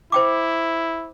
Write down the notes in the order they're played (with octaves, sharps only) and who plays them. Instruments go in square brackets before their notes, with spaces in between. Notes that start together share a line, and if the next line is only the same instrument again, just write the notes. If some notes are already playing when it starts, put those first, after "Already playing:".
[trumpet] E4 [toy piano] C5 G5 D6